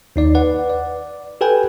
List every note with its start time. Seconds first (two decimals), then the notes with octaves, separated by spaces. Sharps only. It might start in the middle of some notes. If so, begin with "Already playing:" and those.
0.16 D#2 D#4 D5
0.35 B4 D5 F#5
0.69 D5
1.41 G4 A4 B4 G5 G#5